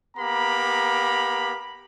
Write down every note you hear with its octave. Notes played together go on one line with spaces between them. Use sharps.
A#3 B3 G4 A#5 B5